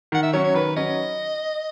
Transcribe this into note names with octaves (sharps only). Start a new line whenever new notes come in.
D#3 F#5
E5
F#3 C#4 C#5
C#5
D#3 B4
F#3 C#4 D#5